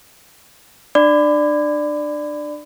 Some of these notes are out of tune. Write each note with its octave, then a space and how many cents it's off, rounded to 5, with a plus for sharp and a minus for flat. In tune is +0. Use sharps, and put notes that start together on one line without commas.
D4 +30 D5 +10 B5 +30